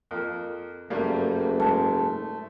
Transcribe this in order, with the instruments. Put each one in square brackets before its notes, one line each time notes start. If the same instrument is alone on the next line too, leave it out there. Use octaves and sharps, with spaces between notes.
[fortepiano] F2 A#3
[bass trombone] F#1 [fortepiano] G2 G3 A#3 [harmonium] A3
[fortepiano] G#2 [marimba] A5